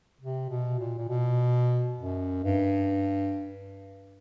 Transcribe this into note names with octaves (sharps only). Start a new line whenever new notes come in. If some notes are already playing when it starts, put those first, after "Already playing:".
C3
B2
A#2
A#2
B2
F#2
G2